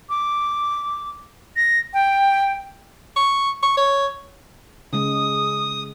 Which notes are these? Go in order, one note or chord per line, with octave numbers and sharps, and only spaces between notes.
D6
A#6
G5
C#6
C#6
C#5
C#3 G#3 D#6